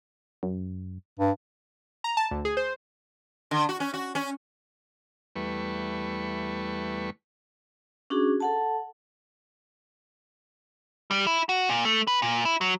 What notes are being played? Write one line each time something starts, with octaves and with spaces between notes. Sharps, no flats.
F#2
G2
A#5
A5
D2
G#4
C5
D3
F#4
C#4
F#4
C#4
E2 G3 A3 B4 C#6
C#4 D4 F#4 G#4
A4 F#5 A5
G3
E4
F#4
A#2
A3
B4
A#2
E4
F#3